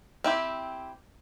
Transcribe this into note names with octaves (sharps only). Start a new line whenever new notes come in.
C4 E4 G4